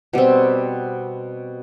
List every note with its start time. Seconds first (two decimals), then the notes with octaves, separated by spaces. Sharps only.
0.13 B2 G3 C4